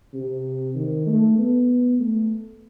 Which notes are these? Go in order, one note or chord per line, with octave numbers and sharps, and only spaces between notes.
C3
D#3
A3
B3
A3